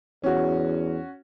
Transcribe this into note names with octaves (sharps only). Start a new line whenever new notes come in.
E2 C#4 F#4